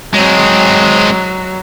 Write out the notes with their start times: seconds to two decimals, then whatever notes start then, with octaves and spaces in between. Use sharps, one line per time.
0.14 F#3 G#3 C4